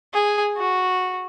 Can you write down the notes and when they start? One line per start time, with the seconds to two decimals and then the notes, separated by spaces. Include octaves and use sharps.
0.14 G#4
0.57 F#4